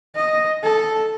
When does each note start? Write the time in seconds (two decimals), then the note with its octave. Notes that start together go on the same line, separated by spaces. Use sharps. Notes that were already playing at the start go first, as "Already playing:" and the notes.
0.16 D#5
0.63 A4